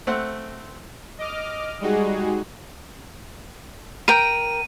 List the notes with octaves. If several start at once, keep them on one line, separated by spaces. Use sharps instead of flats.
A3 C4 F#5
D#5 D6 F6
G3 G#3 D#4 F#4 G#4
A#4 G5 D#7